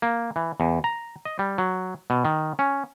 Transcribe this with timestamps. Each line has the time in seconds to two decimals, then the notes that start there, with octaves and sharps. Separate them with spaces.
0.02 A#3
0.36 E3
0.60 E2
0.84 A#5
1.25 D#5
1.39 G3
1.58 F#3
2.10 B2
2.25 D#3
2.59 C#4